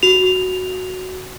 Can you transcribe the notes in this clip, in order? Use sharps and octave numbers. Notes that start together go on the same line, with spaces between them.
F#4 F7